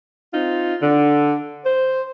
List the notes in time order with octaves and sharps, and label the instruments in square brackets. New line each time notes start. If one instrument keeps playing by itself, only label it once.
[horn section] C4 D#4 F4
D3
C5